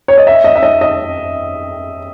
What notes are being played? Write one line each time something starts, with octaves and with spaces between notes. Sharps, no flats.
C#5
D#5
E5
D#5
E5
D#5
D#5